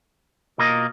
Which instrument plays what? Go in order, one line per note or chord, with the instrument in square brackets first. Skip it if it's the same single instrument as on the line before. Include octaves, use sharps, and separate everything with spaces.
[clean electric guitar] B2 A#3 F4 A#4 D#5